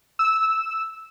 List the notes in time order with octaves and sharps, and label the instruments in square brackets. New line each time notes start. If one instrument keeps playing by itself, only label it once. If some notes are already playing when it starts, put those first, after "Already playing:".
[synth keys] E6